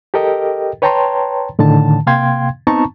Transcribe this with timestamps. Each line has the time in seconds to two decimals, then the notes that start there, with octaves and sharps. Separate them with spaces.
0.14 G4 A4 A#4 D#5 G5
0.82 B4 C#5 G5 A5 A#5 C6
1.59 A2 D3 D#3 A5
2.07 C3 A#3 F5 G5 C6 G#6
2.67 B3 C4 D#4 A5 A#5 C#6